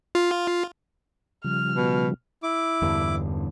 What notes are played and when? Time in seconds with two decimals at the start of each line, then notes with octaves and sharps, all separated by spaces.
0.15 F4
1.44 C#3 F3 G3 F6
1.76 B2
2.43 E4 D6
2.82 E2 G2 D3